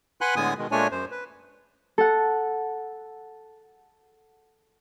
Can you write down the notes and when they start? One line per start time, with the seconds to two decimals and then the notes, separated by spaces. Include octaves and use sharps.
0.21 B4 F#5 G#5 B5 C6 F#6
0.36 A2 D3 G#3 B3 G#5 D#6
0.58 B2 D#3 G#3
0.71 A#2 G#3 A3 D4 C#5 G#5
0.92 F#2 C5
1.11 B4
1.98 A4 F#5